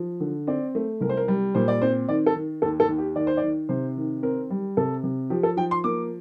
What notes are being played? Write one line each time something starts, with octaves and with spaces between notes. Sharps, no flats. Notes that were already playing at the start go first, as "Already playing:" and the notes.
Already playing: F3
D3
C4 D5
A3
C2 A#4
C5
A#4
G3
A#2 C5
D5
C4 C5
D#3 D5
A4
D#3
D#2 A4
A4
D#2
G4
D#3 D5
C5
D5
D#3
C3 C5
D#3
C4 A#4
G3
C3 A4
C3
F3 G4
A4
F3 G5
C6
A#3 D6